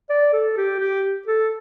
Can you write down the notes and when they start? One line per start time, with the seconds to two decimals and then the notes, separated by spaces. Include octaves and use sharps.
0.09 D5
0.33 A4
0.57 G4
0.80 G4
1.27 A4